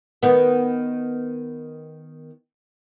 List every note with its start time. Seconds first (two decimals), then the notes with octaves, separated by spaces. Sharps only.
0.23 D#3 B3